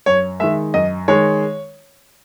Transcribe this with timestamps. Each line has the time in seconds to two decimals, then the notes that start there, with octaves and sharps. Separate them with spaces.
0.06 F#2 C#5
0.40 D#3 G#3 E5
0.74 F#2 D#5
1.08 D#3 G#3 C#5